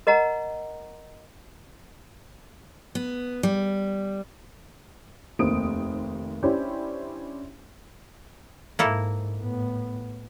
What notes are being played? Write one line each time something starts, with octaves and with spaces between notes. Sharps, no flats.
A#4 D#5 F#5 A#5
B3
G3
F1 D#2 A#3 C5 D#6 D7
C#4 D4 E4 G4 C5 C#5
G#2 A#3 E4 A4
A2 B3